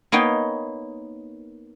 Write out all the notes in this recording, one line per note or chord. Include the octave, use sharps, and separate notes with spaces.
A#3 B3 D#4 C#5 G5